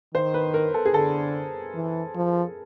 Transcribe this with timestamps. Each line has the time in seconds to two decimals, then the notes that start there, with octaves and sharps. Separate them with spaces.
0.14 D#3 C5
0.34 B4
0.54 A#4
0.74 A4
0.85 G#4
0.94 D3 A4
1.75 E3
2.15 F3